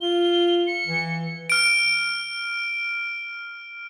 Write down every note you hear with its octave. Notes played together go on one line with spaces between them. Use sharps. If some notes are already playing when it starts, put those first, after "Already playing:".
F4 G7
C#7
E3
F6 D7